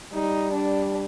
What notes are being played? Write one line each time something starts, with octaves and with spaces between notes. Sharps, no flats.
G3 D#4
D4